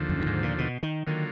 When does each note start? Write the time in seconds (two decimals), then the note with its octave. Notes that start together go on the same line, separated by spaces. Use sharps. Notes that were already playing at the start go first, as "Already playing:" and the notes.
Already playing: D#2 D3 F3
0.09 F#2
0.20 F#2
0.26 G#2
0.43 A#2
0.58 B2
0.83 D#3
1.07 D3 D#3 F#3 A#3 F4